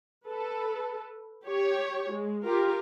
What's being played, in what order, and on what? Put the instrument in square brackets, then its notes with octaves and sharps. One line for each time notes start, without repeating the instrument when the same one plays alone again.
[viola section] A4 B4
G4 C#5
G#3
F4 G4 A#4